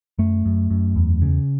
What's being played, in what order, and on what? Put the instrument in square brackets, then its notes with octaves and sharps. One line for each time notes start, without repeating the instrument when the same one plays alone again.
[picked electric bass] F#2 A3
F#2
F#2
E2
C#3